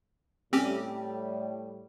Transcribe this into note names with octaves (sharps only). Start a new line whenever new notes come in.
A2 G3 C4 C#4 G4